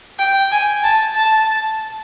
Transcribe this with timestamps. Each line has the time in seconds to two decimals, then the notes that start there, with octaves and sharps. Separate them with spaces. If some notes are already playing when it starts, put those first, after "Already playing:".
0.19 G5
0.52 G#5
0.83 A5
1.15 A5